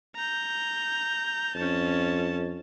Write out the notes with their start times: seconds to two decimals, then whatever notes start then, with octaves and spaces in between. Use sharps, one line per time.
0.16 A#5 G6
1.55 F2 C#4 A5